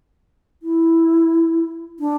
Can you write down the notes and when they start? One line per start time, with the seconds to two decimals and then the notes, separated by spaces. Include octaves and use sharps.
0.63 E4
2.00 D4